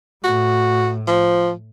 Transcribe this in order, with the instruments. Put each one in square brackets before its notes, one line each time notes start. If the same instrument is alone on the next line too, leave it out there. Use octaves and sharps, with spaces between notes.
[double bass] A2 [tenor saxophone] F#4
[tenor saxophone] F3